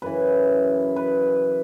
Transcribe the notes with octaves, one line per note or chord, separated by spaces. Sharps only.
F#2 C#3 E3 B4
B4